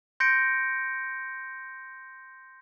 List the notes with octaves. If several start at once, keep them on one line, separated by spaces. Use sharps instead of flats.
C6 G6 A#6 C#7 D7